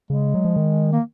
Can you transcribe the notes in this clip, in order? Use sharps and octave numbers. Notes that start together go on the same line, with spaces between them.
C#3 G#3
F#3
F3
D#3
A#3